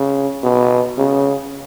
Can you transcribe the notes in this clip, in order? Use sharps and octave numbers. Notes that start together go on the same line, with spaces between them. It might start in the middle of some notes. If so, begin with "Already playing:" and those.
Already playing: C#3
B2
C#3